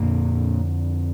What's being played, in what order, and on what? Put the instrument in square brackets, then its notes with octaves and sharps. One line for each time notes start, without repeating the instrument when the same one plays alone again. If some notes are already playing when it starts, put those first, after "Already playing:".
Already playing: [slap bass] F2 A#2 D3 A#3